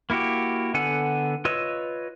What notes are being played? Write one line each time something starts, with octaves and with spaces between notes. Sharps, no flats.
A#3 E4 F#4 G4
D3 B3 A4 F#5 G#5
F4 B4 C#5 D#5 E6